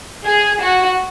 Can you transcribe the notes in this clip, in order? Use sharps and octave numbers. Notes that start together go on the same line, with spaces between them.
G#4
F#4